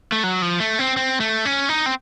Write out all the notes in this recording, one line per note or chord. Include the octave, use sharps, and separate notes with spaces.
A3
F#3
F3
A3
C4
C4
A3
C#4
D#4
C4